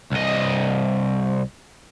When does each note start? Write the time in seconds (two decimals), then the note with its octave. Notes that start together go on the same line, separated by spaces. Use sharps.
0.12 C2 D#5